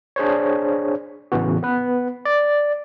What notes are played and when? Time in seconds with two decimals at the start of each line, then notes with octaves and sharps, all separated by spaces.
0.16 D4 G#4 C5 C#5
1.32 A1 C#3 E3 B3 F#4
1.63 B3 B4
2.25 D5